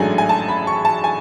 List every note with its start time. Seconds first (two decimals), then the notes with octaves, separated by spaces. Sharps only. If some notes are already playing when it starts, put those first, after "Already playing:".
Already playing: A1 G#2 F#3 A3 D4 G#5
0.18 G#5
0.29 A5
0.48 B5
0.67 C#6
0.85 A5
1.04 G#5